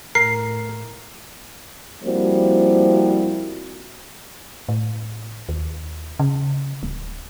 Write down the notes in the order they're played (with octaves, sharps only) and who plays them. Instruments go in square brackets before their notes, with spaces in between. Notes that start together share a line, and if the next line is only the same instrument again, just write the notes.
[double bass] A2 [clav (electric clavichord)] A#4 [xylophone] C7
[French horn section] F3 G3 A#3 C4 E4 F#4
[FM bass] A2
D#2
C#3
D1